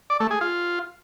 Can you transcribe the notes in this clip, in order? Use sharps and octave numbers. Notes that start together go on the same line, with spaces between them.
D5
A3
G#4
F4